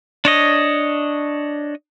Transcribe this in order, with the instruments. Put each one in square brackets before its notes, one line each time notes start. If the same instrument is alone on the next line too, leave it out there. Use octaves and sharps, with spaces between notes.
[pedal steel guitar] D4 C#5 D#5